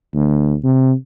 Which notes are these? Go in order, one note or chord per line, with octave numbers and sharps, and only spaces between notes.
D2
C3